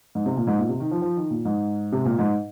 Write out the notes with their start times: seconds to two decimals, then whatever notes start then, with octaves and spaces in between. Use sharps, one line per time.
0.15 G#2
0.26 C3
0.37 A#2
0.47 G#2
0.59 A#2
0.69 C3
0.80 D#3
0.91 F3
1.02 F3
1.17 D#3
1.31 A#2
1.45 G#2
1.92 C3
2.05 A#2
2.19 G#2